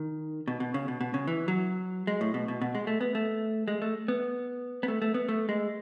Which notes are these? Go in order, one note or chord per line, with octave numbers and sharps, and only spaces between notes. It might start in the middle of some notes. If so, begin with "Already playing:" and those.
Already playing: D#3
B2
B2
C#3
B2
B2
C#3
E3
F#3
G#3
A2
B2
B2
B2
G#3
A3
B3
A3
G#3
A3
B3
B3
A3
A3
B3
A3
G#3